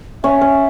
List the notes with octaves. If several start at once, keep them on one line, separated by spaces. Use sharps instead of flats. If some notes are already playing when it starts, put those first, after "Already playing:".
C#4 E5
C#4